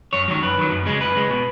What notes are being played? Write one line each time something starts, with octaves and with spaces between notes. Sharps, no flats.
F#2 C#5
D#3 F#3 C#5
F#2 B4
D#3 F#3
F#2
C#3 G#3
F#2 B4
C#3 G#3
B2